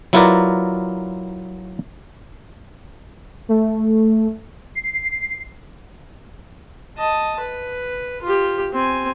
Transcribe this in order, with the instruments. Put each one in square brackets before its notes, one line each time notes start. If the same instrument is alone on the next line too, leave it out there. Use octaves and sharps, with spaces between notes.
[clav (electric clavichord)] F#3 E4 F4 A#4 B4 D5
[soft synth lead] A3
C7
[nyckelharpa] D#5 A5
B4
F4 G4
C4 G#5